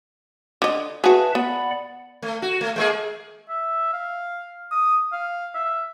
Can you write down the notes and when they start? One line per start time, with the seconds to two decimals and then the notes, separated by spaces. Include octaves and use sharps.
0.62 D3 D#5
1.04 F#4 G#4 B4 E5 A5
1.35 B3 D5 F#5 B5
2.22 A3
2.42 F#4
2.61 A3
2.76 G#3 A#3 G#4
3.49 E5
3.93 F5
4.71 D#6
5.12 F5
5.55 E5